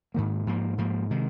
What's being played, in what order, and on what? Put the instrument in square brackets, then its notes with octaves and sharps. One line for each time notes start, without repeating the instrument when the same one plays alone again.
[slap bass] G#2 D#3 A#3
G#2 F3 A#3
G#2 F3 A#3
C3 D#3 G#3